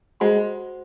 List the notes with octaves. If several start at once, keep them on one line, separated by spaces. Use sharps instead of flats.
G#3 F#4 C5 F#5 C6